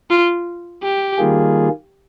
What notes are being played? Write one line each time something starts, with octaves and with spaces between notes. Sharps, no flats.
F4
G4
D#3 G3 A#3 F4 G#4